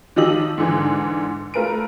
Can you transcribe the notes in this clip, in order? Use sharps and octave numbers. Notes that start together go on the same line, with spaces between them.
D#3 F3 G4 D#5 E6 F#7
G#2 D3 E3
A3 F4 A#4 B4 D7